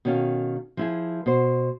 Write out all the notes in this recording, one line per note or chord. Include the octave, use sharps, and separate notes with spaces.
B2 D#3 C#4 A4 F5
F3 E4 G#4
B2 C5